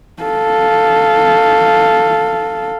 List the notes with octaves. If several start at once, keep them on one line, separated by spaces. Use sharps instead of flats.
A4 F5